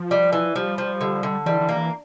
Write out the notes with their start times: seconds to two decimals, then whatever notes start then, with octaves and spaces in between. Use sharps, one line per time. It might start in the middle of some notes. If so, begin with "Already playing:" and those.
Already playing: F3
0.11 G3
0.33 E3
0.56 F3 G3
0.78 F3
1.01 D3
1.23 D3
1.46 E3 G3
1.61 E3
1.69 A#3
1.77 E3